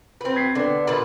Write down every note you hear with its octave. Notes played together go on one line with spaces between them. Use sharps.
C4 B4
G#6 B6 C7
D3 B3 D4
A#2 B4